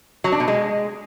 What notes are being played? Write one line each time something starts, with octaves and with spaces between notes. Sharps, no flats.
F#3
D4
B2
G#3